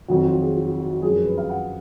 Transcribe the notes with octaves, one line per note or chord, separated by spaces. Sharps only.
F2 D#3 F#3 F#4
F4
G#4
F4
F4
F#4
F#4
F#2 F3 G#3 G#4
A#4
B4
F5
F#5